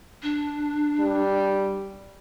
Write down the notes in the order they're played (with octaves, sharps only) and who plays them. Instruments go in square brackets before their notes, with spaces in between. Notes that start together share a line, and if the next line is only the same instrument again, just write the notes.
[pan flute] D4
[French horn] G3